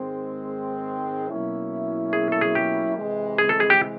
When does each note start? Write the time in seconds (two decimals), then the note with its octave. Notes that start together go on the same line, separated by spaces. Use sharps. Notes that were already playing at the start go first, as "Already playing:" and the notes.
Already playing: G#2 D#3 G#3 C4
1.29 B2 F#3 A#3 C#4 E4
2.13 G#4
2.32 A4
2.41 G#4
2.55 G4
2.97 C3 E3 G#3
3.38 G#4
3.49 A4
3.60 G#4
3.70 G4